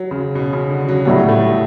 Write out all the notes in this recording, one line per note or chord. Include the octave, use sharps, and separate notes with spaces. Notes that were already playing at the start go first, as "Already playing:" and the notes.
Already playing: F#3
C#3
B2
C#3
D3
F#3
A2 F#3 G3 B3
A3